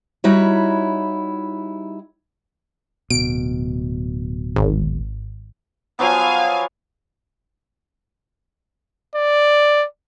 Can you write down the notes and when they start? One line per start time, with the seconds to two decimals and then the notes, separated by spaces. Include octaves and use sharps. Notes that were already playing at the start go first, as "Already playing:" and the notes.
0.24 G3 D#4 E4 F#4 C#5
3.10 D1 B2 D7
4.56 G#1
5.99 F3 F#3 B3 F5 G#5
9.16 D5